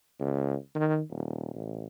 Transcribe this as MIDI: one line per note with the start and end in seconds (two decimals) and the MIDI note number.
0.20 0.55 37
0.75 1.00 51
1.10 1.53 27
1.54 1.87 33